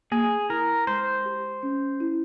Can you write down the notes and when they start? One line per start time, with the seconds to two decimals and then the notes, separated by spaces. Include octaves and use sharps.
0.12 A#3 G#4
0.49 E4 A#4
0.87 G#3 C5
1.25 G4
1.63 C#4
2.00 E4